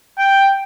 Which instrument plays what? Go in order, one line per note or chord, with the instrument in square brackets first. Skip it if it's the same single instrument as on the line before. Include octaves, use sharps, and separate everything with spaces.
[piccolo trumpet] G5